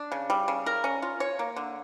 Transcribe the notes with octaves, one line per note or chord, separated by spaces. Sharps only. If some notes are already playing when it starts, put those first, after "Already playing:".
Already playing: D4
C#3
G3
C#3
A#4
C#4
F4
C#5
A#3
D3